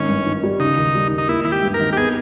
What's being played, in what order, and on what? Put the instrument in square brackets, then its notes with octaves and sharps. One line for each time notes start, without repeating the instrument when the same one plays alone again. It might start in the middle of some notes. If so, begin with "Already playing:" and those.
Already playing: [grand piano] G#1 [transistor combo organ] C#4
[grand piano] G2
D#3
G3
[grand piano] C#3 [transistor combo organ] D#4
[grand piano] D#2
G3
D#2
[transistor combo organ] D#4
[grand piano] A#3 [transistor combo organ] E4
[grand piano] G#1 [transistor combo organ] E4
[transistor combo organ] G4
[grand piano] G2
[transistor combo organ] A#4
[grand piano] G#1
[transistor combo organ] G4
[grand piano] B3 [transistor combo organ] G#4